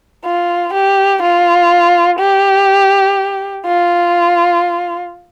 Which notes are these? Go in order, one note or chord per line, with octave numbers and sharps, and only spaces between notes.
F4
G4
F4
G4
F4